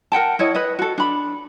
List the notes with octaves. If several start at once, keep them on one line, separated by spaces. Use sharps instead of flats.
A#4 F#5 G5 A5
E4 C#5 D#5
B4 D#5
F#4 A4
D4 B5